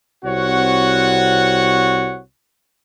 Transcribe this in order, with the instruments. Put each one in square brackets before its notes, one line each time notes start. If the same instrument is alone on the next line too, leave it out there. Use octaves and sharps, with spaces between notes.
[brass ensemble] C2 C4 F#4 C#5 F#5